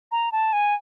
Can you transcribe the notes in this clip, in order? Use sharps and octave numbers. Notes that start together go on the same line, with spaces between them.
A#5
A5
G#5